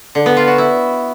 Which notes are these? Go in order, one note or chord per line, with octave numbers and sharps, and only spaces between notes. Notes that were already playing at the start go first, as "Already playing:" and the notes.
D3
B3
F4
F#4
E4